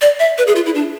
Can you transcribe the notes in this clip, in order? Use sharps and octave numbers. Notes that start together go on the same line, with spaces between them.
D5
E5
B4
G#4
F4
E4
D4